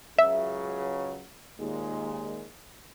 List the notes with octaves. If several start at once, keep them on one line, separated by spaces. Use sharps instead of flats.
C#2 C#3 F#3 E5
D#2 A#2 G#3